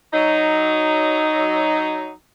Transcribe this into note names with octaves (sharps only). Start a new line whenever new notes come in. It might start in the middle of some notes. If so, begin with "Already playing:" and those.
F#3 D#4